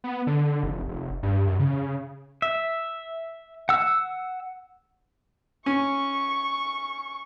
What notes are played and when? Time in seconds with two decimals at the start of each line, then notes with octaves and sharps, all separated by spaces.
0.04 B3
0.27 D3
0.63 F1
0.88 F1
1.23 G2
1.47 F#2
1.59 C#3
2.42 E5
3.69 F#5 E6
5.66 C#4 C#6